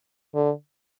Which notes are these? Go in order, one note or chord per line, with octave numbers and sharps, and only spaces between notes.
D3